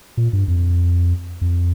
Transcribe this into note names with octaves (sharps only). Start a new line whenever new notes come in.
A#2
G2
F2
F2